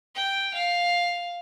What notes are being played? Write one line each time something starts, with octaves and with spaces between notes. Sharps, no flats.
G5
F5